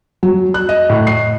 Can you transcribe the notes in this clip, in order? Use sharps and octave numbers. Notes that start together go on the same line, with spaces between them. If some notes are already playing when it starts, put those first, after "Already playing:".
F#3
F#6
D#5
A2
C7